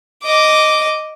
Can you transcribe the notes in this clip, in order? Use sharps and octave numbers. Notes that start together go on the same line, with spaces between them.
D#5 D6